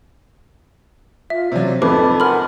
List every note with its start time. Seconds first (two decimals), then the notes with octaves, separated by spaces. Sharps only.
1.30 F4 E5
1.52 C3 F#3 D5
1.82 G#1 F2 A4 B4 B5 D6
2.20 A#4 F#5 G#5 B5 C6 F6